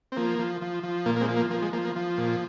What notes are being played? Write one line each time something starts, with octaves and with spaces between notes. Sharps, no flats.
C4
F3 A#3
F3
F3
F3
A#2 A#3
A#3
G#3 C4
F3
A#3
F3 A#3
G#3
F3 A#3
A#3
F3
A#2